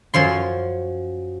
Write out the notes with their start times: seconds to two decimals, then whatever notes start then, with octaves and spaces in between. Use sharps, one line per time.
0.14 F#2 F3 C#5 C6